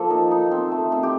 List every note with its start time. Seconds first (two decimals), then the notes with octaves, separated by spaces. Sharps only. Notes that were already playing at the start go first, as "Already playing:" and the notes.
Already playing: F3 A#3 A4
0.10 D#4
0.31 D#4
0.51 C4
0.72 A3
0.92 C4
1.03 G4